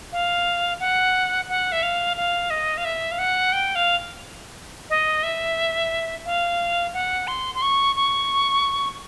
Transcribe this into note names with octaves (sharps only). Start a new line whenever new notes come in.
F5
F#5
F#5
E5
F5
F5
D#5
F5
E5
F5
F#5
G5
F5
D#5
E5
F5
F#5
C6
C6
C#6
C#6